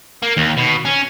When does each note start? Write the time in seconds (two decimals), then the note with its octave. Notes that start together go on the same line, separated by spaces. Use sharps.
0.22 A#3
0.37 D#2
0.57 B2
0.85 C#4